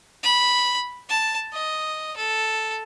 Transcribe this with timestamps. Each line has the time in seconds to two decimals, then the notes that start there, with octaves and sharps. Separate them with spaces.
0.23 B5
1.09 A5
1.53 D#5
2.16 A4